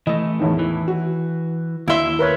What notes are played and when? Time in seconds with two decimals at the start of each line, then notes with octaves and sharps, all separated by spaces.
0.07 E3 A3 D#5
0.39 E2 A2 D#3
0.59 E3
0.88 F#4
1.88 D#2 E4 E5 C6
2.19 A#4 B4 C#5